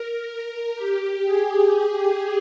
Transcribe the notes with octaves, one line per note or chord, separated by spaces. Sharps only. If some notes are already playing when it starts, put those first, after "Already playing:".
Already playing: A#4
A#4
G4
G#4